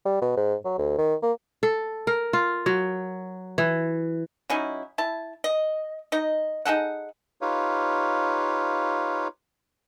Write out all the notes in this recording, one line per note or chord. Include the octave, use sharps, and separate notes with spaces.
G3
B2
G#2
F#3
D2
D#3
A#3
A4
A#4
F4
F#3
E3
F#3 C#4 D#4 E4
E4 A5
D#5
D#4 D#5
D#4 G#4 A4 F#5
D#4 F4 G4 B4 C#5 F5